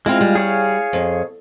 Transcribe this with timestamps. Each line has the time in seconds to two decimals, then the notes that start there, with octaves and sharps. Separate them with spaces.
0.06 G#3 C4 E4 F4 F5
0.21 G3
0.35 G#4 C#5 F5
0.93 F2